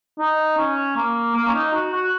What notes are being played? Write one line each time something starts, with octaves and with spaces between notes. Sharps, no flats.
D#4
C#4
A#3
A#3
C#4
D#4
F#4
F#4